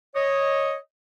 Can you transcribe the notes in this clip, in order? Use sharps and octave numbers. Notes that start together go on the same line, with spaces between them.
C#5 D#5